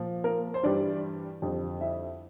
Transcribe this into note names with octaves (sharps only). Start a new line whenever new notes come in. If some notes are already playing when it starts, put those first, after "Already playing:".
Already playing: A#2 F3
A#3 A#4
C5
G2 E3 G3 D4 D5
F2 D3 G3
E4 E5